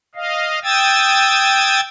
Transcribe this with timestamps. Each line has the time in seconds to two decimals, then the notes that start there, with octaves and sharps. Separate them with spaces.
0.15 D#5 F5
0.64 G5 D#6 E6 G#6 A6